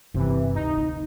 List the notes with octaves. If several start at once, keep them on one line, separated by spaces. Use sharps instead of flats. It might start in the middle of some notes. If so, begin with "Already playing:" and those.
G1 C3 E3 D#4
D2 D#4
D2 A#3